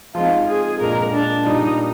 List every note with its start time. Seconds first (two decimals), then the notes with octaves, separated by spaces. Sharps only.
0.15 F3 G#3 C4 D#4 F4
0.47 G#4
0.80 A#2 G#3 D4 A#4
1.13 D4
1.45 A#2 G3 D4 D#4